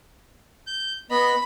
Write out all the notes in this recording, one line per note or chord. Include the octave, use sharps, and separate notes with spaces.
G6
B3 D#5 B5